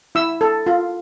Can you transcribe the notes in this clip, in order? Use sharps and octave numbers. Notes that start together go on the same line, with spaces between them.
E4 E6
A4
F4